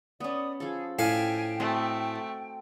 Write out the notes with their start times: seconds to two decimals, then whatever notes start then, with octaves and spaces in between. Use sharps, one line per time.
0.20 B3 C#4 D5 D#6
0.60 F3 G#4 A4
0.99 A2 F5 G5 G#5
1.60 A3 C4 F#4 D#5